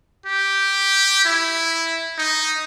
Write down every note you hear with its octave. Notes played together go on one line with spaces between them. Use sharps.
G4
E4
D#4